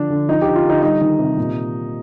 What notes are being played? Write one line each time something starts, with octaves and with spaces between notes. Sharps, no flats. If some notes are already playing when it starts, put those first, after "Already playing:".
Already playing: D3 F3 D4
D3
F3 D#4
D3 G4
F4
D3 D#4
G3 D#4
D#3
C3
A#2